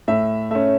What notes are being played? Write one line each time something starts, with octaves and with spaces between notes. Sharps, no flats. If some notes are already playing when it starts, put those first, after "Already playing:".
A2 E5
A3 C#4 E5